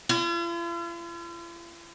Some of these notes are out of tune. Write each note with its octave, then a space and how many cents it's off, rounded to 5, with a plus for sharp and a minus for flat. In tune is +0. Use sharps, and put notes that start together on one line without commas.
F4 -45